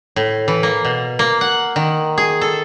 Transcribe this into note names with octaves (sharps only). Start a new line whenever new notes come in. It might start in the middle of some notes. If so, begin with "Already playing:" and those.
A2
E3
A#3
B2
A#3
F#5
D#3
G#4
A4